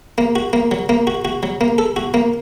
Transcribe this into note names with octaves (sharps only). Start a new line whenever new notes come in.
A#3
F#4
A#3
F#3
A#3
F#4
F#4
F#3
A#3
A4
F#4
A#3